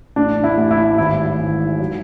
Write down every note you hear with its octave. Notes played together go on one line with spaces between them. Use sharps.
A1 D4
E4
A1
E4
G#1 E4
G#1
F#3